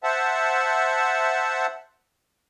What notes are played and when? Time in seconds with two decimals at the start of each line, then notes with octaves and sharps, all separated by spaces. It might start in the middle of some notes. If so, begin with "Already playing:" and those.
0.04 C5 E5 F#5 A5